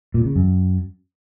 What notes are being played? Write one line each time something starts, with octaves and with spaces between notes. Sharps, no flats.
A#2
C#3
F#2